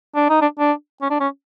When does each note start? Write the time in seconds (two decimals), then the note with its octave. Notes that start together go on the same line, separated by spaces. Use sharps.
0.15 D4
0.29 D#4
0.41 D4
0.59 D4
1.02 C#4
1.10 D4
1.20 C#4